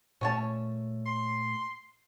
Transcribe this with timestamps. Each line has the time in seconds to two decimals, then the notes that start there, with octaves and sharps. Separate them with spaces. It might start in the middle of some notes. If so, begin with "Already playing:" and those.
0.21 A#2 A3 C#4 C#5 A5
1.06 C6